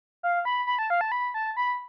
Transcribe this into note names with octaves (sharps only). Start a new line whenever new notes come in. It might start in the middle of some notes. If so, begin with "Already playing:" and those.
F5
B5
B5
A5
F5
A5
B5
A5
B5